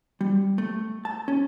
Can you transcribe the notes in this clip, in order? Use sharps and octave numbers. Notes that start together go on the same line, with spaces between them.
G3
A3
A5
C#4